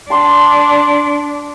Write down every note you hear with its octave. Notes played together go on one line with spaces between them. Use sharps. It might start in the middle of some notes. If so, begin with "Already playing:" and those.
D4 A5 C6 D6